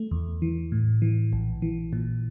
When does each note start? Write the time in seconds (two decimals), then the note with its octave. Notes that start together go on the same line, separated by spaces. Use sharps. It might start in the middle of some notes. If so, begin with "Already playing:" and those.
Already playing: A3
0.11 E2
0.42 E3
0.72 A2
1.02 E3
1.33 A#1
1.62 E3
1.93 A#2